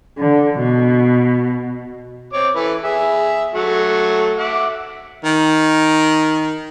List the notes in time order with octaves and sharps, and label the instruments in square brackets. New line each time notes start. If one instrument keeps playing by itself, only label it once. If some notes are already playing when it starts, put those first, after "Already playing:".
[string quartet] D3
B2
[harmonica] C4 C#5 D6
E3 A4 B4
G#4 E5
F#3 A3 F#4
E5 F#5 D6
[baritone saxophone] D#3